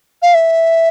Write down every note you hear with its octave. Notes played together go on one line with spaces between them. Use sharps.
F5
E5